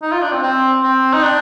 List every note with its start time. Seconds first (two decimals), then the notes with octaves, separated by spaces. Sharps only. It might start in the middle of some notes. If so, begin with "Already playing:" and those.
0.02 D#4
0.12 F4
0.22 D4
0.32 C4
0.43 C4
0.83 C4
1.13 D#4
1.23 D4